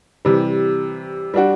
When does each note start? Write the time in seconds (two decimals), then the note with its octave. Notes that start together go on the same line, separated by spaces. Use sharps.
0.25 C3 E3 G3
1.34 G3 D4 F#4